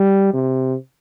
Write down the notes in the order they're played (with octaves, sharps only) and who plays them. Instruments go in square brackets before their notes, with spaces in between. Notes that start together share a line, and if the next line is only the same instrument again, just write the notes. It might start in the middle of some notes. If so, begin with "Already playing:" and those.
Already playing: [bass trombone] G3
C3